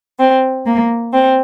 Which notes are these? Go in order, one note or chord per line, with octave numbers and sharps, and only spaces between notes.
C4
A#3
C4